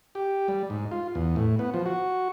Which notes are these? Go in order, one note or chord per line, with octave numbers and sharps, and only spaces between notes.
G4
G3
G#2
F4
E2
A2
B3
F3
F#4